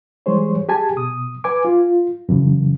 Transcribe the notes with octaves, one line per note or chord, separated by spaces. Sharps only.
E3 G3 G#3 G#4 C5 C#5
G4 G#4 G#5 A5
B2 D#6
B4 G#5 D6
F4
F#2 C#3 E3